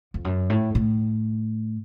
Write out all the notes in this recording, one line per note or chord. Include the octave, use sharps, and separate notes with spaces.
F2
F#2
A2
A2